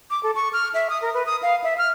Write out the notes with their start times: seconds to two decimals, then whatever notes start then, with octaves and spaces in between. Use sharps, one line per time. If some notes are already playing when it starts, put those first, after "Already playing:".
0.10 D6
0.23 A4
0.36 C#6
0.53 F6
0.74 E5
0.90 D#6
1.02 A#4
1.14 B4
1.26 D#6
1.43 F5
1.64 E5
1.78 F6